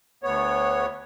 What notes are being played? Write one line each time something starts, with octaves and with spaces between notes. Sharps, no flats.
D2 B3 C#5